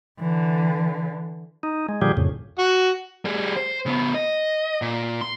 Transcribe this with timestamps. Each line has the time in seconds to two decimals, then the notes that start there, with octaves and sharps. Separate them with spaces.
0.18 D3 E3
1.63 D#4
1.89 G#3
2.02 A#2 D3 F3 G3 G4 G#4
2.17 F2 A2 C#3
2.59 F#4
3.25 G3 G#4
3.56 C5
3.86 C#3 B3
4.14 D#5
4.82 A#2
5.21 C6